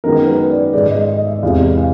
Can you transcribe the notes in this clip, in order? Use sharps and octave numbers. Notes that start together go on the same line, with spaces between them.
F#2 D#3 G#3 B3 A#4
B4
D5
G#2 D#3 G#3 D5
D#5
D#5
E5
E2 C3 E3 G#3 F5
F5